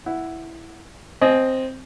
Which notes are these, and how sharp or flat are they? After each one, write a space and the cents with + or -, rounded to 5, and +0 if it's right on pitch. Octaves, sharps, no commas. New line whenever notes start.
E4 +0 F#5 +0
C4 +0 D#5 +0 G#5 +35